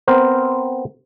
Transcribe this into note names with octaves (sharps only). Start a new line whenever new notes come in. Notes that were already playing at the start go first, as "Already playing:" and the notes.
B3 C4 A#4 C5